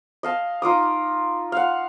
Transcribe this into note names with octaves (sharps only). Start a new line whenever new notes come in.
D#5 F5 A5
D#4 F4 D6 D#6
F5 F#5